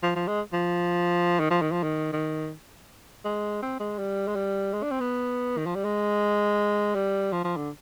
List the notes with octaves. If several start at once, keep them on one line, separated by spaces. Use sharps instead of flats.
F3
F3
G#3
F3
D#3
F3
D#3
F3
D#3
D#3
G#3
C4
G#3
G3
G#3
G3
G#3
D4
C4
B3
D#3
F3
G3
G#3
G3
F3
F3
D3